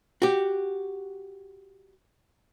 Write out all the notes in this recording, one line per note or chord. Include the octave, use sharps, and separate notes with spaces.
F#4 G4